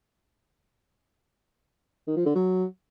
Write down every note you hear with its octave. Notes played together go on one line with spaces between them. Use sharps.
D#3
F3
D3
F#3